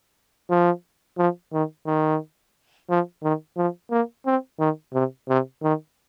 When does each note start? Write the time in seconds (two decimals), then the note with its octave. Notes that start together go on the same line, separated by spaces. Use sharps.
0.50 F3
1.18 F3
1.53 D#3
1.86 D#3
2.90 F3
3.23 D#3
3.57 F3
3.91 A#3
4.26 C4
4.59 D#3
4.94 C3
5.29 C3
5.63 D#3